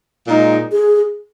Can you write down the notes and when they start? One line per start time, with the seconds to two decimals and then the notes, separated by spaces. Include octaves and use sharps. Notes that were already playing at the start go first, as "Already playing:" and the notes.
0.26 A#2 G#3 D#4
0.72 G#4